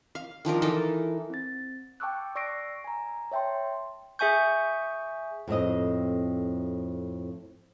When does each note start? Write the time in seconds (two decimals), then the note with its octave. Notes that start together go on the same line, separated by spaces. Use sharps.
0.15 F5
0.45 D#3 F3 D4 A#4
0.62 E3 D#4 A4 A#4
1.30 C4 A6
2.00 G5 A5 C#6 D6 E6 F#6
2.35 D5 C#6 E6 A#6 C7 D7
2.84 G#5 A#5
3.31 C#5 E5 G5 A5 C6
4.19 G#4 E5 G#5 C#6 G6
5.48 F2 A2 C4 D#5